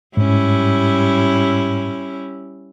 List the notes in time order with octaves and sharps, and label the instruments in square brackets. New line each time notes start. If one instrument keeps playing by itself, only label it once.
[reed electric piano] G#2 [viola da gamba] G3 C#4 E4